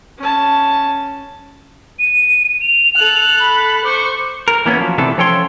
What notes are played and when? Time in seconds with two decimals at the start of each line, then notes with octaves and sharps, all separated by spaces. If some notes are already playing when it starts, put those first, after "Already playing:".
0.18 C#4 A5
1.99 D#7
2.61 F7
2.96 A4 F#6
3.40 B5
3.85 C5 C#6 D6
4.48 A#4
4.66 E3 A#3 B3 C#4
4.78 F3 F#3
4.98 C3 E3 A3 B3 D4 A4
5.18 F3 C#4 A4 C#5 G5 C6